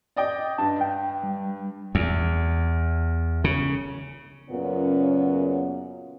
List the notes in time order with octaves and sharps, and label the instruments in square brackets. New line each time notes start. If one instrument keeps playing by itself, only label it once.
[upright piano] D5 D#5 G5
[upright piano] G2 [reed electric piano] A5
[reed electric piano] G5
G3
[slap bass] E2
C#3
[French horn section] F#2 A#2 C#3 B3 C#4